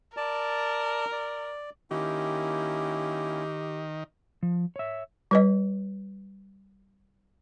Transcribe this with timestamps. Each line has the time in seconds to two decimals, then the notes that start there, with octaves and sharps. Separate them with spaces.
0.17 A#4 D5 A5
1.12 D5
1.91 D#3 A#3 C#4 E4 G4
4.43 F3
4.76 C#5 E5
5.31 G3 B4 D#5